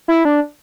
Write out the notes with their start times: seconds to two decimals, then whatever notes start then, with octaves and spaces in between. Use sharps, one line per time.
0.08 E4
0.25 D4